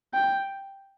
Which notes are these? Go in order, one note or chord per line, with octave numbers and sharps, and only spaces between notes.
G5